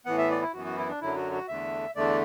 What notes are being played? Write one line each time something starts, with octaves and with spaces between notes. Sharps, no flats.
A2 E3 B3 F#5
E5
D5
E4
F#2 E3 B3 F#4
F#4
E4
D4
F#2 D3 F#3 E4
F#4
F#4
E2 D3 A3 E5
E2 D3 A3 D5